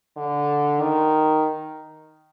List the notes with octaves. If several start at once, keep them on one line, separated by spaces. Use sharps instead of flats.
D3
D#3